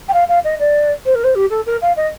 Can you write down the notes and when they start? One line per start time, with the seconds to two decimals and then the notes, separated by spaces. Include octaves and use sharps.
0.08 G5
0.14 F5
0.29 F5
0.44 D#5
0.59 D5
1.06 C5
1.15 A#4
1.24 C5
1.35 G4
1.50 A4
1.66 A#4
1.82 F5
1.97 D#5